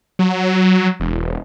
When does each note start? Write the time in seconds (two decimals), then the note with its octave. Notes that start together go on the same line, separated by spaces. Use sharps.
0.19 F#3
1.00 E1